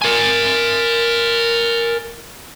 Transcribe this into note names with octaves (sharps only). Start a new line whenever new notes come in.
A#4 G#5